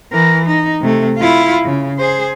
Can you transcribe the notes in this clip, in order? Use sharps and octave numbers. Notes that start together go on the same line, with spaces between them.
E3 A#4
D#4
C3 A3
E4 F4
C#3
G#4 C5